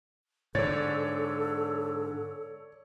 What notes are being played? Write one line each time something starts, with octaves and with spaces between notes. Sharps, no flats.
G#2 D3 A4 C#5 D5 A6